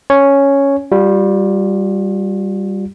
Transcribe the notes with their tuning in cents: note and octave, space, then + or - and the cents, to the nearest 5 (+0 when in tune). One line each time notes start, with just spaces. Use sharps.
C#4 +0 C#5 +0
G3 +0 F4 +35